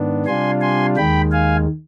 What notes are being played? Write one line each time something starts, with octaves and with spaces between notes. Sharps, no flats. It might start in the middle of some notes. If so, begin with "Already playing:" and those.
Already playing: G#2 D#3 B3 D4
C3 G3 D4 F4 G#5 C6
G#5 C6
D#2 D#3 G#3 G5 B5
F5 G#5